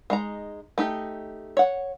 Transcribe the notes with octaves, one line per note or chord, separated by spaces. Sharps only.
G#3 D#4 A#5
A3 D#4 G4
C#5 F#5